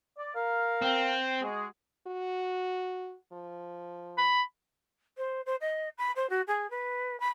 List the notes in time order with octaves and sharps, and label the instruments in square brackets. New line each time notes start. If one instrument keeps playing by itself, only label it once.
[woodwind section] D5
A#4 F5
[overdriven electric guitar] C4
[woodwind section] G#3 F#4 G#4
[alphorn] F#4
F3
[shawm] B5
[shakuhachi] C5
C5
D#5
B5
C5
F#4
G#4
B4
B5